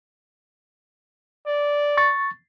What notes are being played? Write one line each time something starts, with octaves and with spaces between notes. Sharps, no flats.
D5
C#6 A6